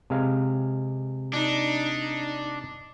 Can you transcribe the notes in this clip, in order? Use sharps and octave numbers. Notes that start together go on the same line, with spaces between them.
C3 G#3 F5
D4 D#4